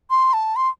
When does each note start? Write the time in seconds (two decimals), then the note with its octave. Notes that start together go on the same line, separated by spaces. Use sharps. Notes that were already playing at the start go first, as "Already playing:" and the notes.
0.10 C6
0.33 A5
0.56 C6